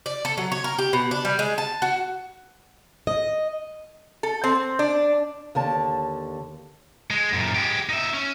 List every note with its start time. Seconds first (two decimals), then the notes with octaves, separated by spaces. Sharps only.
0.06 D5
0.25 A4
0.38 F#3
0.52 C#5
0.64 A#4
0.79 G4
0.93 B2
1.11 D4
1.25 G3
1.39 G#3
1.58 A5
1.82 F#4
3.07 D#5
4.23 A4
4.44 C4
4.79 D4
5.55 D#2 D3 A5
7.11 G#3
7.33 F#2 A#2
7.55 G#3 G4
7.89 D#4 E5
8.14 C#4